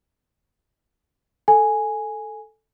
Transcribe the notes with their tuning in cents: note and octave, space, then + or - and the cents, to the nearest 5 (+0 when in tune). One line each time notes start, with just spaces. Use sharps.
A4 +0 G#5 +0